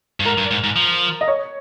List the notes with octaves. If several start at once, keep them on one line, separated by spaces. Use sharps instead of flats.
G2
G#2 A#4
G2
G#2
G#2
F3
D#5
C#5